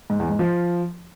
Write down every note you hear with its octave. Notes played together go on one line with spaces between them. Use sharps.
G#2
E2
G#2
F3